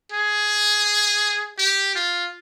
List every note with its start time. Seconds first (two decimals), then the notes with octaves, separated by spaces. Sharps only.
0.12 G#4
1.58 G4
1.95 F4